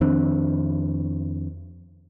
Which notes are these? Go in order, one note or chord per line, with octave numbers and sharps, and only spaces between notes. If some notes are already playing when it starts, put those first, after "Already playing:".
F2 D#3 C4 D4